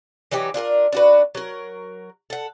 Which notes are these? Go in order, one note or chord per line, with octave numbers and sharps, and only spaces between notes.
E3 F#3 D#4 G4
D4 F4 A4 A#4
D4 F#4 B4
F#3 A#4
A4 F#5